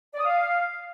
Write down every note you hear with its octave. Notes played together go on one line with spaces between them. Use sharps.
D5
D#6
F5